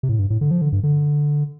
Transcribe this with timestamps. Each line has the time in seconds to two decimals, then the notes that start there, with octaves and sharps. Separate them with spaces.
0.03 C3
0.09 A2
0.19 G2
0.30 A2
0.41 D3
0.51 F3
0.61 D3
0.72 G2
0.83 D3